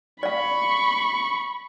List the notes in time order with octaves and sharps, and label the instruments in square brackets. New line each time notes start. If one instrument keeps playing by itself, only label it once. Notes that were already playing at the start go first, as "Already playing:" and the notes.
[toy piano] D5 F5 [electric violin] B5 C#6